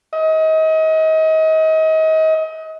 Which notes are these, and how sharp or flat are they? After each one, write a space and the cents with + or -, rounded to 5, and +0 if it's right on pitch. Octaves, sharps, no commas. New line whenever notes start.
D#5 +30